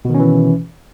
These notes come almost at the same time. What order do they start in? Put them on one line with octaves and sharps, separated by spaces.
B2 D#3 C#4 E3